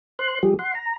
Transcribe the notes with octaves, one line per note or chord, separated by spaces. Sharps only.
C5 C6 F#6
F3 G3 G4 G#4
F#5 C6
A#5